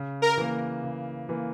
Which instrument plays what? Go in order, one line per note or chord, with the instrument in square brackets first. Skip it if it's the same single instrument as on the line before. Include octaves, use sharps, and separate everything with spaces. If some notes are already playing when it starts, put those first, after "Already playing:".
Already playing: [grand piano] C#3
[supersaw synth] A#4
[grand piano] E3 A#3
C#3
E3 A#3